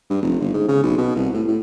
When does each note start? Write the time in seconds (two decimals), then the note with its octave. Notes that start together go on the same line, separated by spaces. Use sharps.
0.10 G2
0.22 F1
0.40 G1
0.54 G#2
0.68 C#3
0.83 B1
0.98 B2
1.15 C2
1.33 A2
1.48 A2